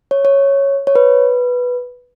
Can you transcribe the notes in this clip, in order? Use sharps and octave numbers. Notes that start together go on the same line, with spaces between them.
C#5
C#5
C#5
B4